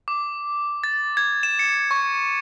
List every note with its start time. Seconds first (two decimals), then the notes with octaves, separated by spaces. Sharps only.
0.08 D6
0.84 A6
1.17 G#6
1.43 E7
1.59 C#7
1.91 C#6